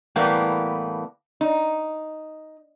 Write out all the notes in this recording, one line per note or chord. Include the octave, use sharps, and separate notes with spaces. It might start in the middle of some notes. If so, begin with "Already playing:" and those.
A2 E3 G3 A#3 B3
D#4